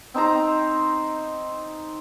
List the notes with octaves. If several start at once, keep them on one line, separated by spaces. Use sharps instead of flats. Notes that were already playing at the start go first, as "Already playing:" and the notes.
C4 D#4 C5 A#5